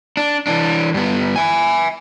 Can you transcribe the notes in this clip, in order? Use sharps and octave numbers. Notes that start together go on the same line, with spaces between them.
D4
E3 D4
G2 B3
E5 G#5